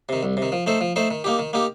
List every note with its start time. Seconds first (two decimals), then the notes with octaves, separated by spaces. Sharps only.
0.09 C3 D#3
0.23 C2
0.37 C3
0.42 D#3
0.52 F3
0.66 A3 D#4 A4 C5
0.81 F3
0.96 A3 D#4 A4 C5
1.11 D#3
1.24 A#3 D#4 G4
1.39 D#3
1.53 A#3 D#4 G4